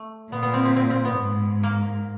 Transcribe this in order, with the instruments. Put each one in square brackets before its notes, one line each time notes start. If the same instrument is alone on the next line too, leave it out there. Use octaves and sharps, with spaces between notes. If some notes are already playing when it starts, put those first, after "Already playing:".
Already playing: [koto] A3
[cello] A#2 [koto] B3
[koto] B3
C4
C4
C4
C4
B3
[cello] G#2
[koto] A#3